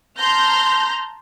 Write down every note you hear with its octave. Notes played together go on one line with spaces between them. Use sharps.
A5 A#5 C6 F6 G6 A#6